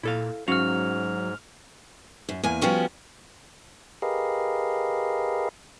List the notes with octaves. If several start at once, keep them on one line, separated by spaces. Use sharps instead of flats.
A#2 E4 A4 F5
G#2 F#3 C#4 F#4 F5 F6 F7
F#2
E2 A#3 G#5
F3 G3 B3 C#4 F#4
G4 G#4 A#4 B4 D#5 F5